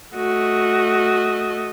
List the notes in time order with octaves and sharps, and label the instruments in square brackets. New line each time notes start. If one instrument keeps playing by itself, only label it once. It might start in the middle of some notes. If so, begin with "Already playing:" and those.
[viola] A3 D#5 [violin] F#4